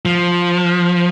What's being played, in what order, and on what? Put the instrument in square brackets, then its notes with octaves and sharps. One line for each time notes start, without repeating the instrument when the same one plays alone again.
[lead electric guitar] F3